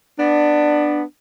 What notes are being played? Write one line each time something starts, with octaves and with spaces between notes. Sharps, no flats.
B3 D4